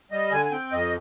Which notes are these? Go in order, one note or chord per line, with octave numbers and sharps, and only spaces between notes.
G3 D#5
D3 G#5
G#5
C4 G5
F2 D#5